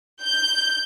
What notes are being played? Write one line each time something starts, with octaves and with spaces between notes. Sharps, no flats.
G6